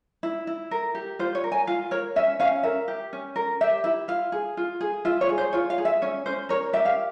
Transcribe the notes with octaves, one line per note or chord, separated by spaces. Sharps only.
E4
E4
A#4
G4
F4 C5
C#5
A#4
G#5
F4 F5
A#4 C#5
C#4 E5
C#4 F5
A#4 E5
G4
C#4
A#4
G4 E5
E4 E5
F4 F5
G#4
F4
G#4
F4 E5
C#5
G#4
C5
F4 C#5
F5
G#4
E5
C#4 C#5
C#4 C5
A#4 C#5
G4 E5
F5